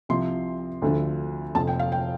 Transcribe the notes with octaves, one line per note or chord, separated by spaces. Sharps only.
C2 C3 F3 C6
D2 D3 F3
F1 F2 F3 A5
G5
F5
G5